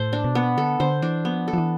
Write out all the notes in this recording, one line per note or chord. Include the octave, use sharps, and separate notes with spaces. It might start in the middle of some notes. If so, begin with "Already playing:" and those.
Already playing: A2 A4 C5
D4
B2
B3
D3 A4
D3 C5
E3 D4
F3 B3
A4
F3
E3